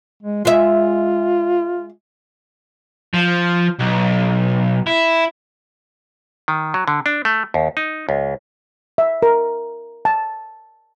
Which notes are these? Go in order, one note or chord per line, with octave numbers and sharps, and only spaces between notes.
G#3
G#3 F4 E5
F3
B1
E4
D#3
F#3
D3
D4
A3
D#2
D#4
C#2
E5
A#4
A5